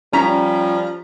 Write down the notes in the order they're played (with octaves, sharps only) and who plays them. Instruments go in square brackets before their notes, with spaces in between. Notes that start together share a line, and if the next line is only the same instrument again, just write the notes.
[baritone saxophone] F3 [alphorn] G3 [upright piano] C#4 B6 [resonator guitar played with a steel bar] A#5